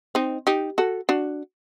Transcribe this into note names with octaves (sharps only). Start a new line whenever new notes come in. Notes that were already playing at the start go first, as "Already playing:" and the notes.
C4 D#4
D#4 G4
F#4 A4
D4 F#4